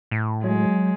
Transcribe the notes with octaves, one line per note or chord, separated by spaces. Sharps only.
A2
F#3 G#3